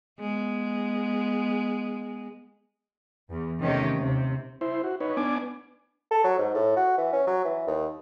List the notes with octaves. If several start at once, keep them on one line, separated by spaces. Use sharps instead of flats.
G#3 B3
E2
C3 D#3 A3 C#4 D#4 G4
D#2 C3
E4 C5
F#4
D#4 B4 C#5
B3 D4 G#5 D6
A4
F#3
G#2
A2
F#4
E3
C#4
F#3
E3
D#2